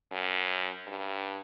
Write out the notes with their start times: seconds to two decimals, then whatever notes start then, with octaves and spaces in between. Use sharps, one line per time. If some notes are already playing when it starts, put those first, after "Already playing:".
0.12 F#2
0.87 G2